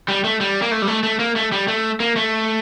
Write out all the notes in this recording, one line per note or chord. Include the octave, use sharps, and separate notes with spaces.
G3
A3
G3
A#3
A3
G3
A3
A3
A#3
A3
G3
A3
A#3
A3